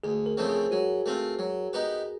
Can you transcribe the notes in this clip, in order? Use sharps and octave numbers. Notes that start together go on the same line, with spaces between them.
D2 G#4
A#4
C#3 F3 A3 C4
G#4
F#3 F#4
A3 C4 F4
F#3
B3 D#4 G4 B4